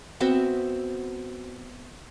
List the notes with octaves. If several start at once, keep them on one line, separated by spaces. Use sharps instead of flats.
B3 C4 F#4 E5